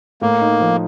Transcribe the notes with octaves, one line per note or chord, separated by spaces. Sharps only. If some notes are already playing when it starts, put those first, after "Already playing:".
A2 A#3
D#4
F3